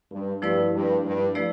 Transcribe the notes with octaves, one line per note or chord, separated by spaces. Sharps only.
G2
G2 F3 A3 E4 B4 D5
G2
G2
F3 A3 E4 B4 D5